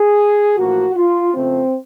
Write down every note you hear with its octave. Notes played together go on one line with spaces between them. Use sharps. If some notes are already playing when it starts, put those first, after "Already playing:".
Already playing: G#4
A1 A2 F3 A#3 F#4
F4
F2 C#3 F3 A3 C4